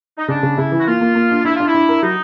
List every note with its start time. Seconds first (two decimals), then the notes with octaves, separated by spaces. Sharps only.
0.18 D#4
0.28 C#3 D4
0.43 C#3
0.58 C#3 E4
0.72 E3
0.80 F#4
0.87 A#3 F4
1.01 A#3
1.15 A#3
1.31 D4
1.45 D4 E4
1.56 D4 F4
1.68 E4
1.75 D4
1.89 A#4
2.03 F#3 D#4